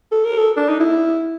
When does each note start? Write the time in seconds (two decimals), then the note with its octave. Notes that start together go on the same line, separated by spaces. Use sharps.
0.12 A4
0.25 A#4
0.37 A4
0.57 D4
0.69 D#4
0.80 E4